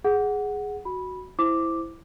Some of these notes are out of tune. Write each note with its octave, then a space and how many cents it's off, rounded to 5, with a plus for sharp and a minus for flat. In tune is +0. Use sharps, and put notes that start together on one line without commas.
G#4 +0 F#5 +0
F#4 +0 B5 -10
E4 +0 C5 -5 D6 +0